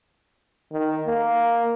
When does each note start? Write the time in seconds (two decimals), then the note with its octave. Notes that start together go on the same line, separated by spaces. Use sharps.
0.72 D#3
1.07 A#3